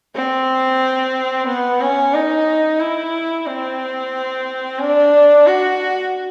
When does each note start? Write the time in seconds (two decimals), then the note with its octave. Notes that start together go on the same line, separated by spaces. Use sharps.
0.15 C4
1.48 B3
1.81 C#4
2.14 D#4
2.80 E4
3.46 C4
4.80 D4
5.46 F#4